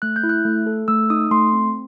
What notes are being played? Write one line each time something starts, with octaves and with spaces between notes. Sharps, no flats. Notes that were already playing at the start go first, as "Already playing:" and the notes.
A3 F#6
G6
E4
F#6
A3
A4
A3 E6
D#4 D#6
A3 C6
C4